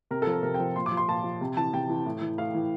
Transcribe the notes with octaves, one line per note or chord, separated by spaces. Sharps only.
C3 A#4
F3 A4
A#4
C3 A#4
G5
F3
A#2 C6
D6
F3
C6
A#2 A5
F3
C3
E3 A5
C3 G5
E3
A2
E3
A2 F5
E3